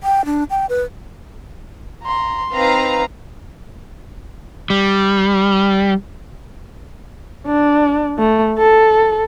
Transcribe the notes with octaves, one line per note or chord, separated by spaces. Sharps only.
G5
D4
G5
B4
A#5 C6
C4 D#4 B4 F5 A#5
G3
D4
A3
A4